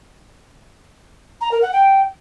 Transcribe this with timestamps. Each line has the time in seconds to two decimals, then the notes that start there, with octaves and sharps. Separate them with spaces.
1.41 A#5
1.52 A#4
1.62 F#5
1.73 G5